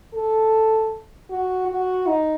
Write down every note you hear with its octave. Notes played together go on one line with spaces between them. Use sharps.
A4
F#4
F#4
D#4